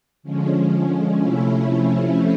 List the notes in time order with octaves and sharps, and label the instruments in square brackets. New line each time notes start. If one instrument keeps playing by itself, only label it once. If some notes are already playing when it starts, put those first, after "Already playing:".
[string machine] D3 F3 G#3 C#4
C3 F3 A3 C#4 E4